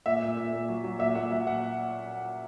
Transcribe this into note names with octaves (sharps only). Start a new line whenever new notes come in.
A#2 E5
A#2
A#2
A#2
F#3
F#3
A#2 E5
A#2 F#5
F#3 E5
A#2 F#5